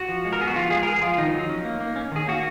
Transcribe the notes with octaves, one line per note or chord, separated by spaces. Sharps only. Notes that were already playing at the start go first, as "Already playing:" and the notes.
Already playing: F#4
F3
G#3
A#4
B3 G#4
F#4
F3 F4
G#3 G#4
A#4
B3 G#4
F3 F4
D#3 D#4
F#3
C#4
A#3
A#3
C#4
D#3 G#4
A#3 F#4